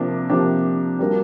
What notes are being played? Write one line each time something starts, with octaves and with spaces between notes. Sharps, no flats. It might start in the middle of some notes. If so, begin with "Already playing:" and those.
Already playing: C3 F3 A#3 D4 G4
C3 F3 A#3 D4 G4
G3 A#3 D4 F#4 A#4